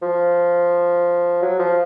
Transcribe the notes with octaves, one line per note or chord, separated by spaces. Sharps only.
F3
F#3
F3